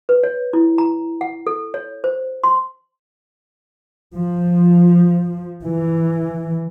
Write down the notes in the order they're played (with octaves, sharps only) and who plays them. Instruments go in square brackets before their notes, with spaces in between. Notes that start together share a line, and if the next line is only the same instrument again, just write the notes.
[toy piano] B4
C#5
E4
A#5
F#5
A4
C#5
C5
C6
[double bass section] F3
E3